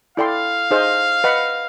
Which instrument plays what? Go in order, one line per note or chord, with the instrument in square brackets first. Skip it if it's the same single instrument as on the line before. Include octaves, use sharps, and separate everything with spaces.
[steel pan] E4 A4 D5 G5 C6 [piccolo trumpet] F5
[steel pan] D#4 G#4 C5 D#5
B4 D#5 F#5 B5